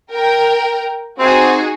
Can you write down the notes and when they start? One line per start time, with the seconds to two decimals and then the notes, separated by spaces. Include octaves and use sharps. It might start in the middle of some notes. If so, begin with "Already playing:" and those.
0.12 A#4 G5
1.19 C4 D#4 F#4 G#4